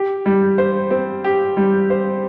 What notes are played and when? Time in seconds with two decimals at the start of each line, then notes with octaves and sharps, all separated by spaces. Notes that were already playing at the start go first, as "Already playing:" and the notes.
Already playing: G4
0.26 G3
0.58 C5
0.90 C4
1.24 G4
1.57 G3
1.90 C5